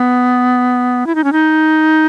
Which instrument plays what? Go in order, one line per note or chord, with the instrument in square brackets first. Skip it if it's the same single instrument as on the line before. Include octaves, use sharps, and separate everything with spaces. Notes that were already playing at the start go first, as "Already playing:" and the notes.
Already playing: [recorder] B3
E4
D#4
C#4
D#4